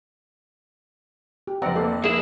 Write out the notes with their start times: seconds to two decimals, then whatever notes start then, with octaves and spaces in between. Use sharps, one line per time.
1.47 G4
1.62 F1 C4 D5 F#5 A#5
1.76 A#3 A4
2.04 A#3 E4 G#4